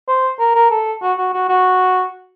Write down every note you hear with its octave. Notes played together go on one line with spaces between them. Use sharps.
C5
A#4
A#4
A4
F#4
F#4
F#4
F#4